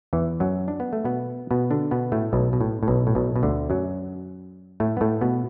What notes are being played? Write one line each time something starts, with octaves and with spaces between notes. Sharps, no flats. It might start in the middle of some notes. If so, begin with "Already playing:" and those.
E2 E3
F#2 F#3
D4
B3
A3
B2 B3
B2 B3
D3 D4
B2 B3
A2 A3
B1 B2
B2
A2
A2
B1 B2
A2
B1 B2
B2
D2 D3
F#2 F#3
A2 A3
B3
A2 A3
B2 B3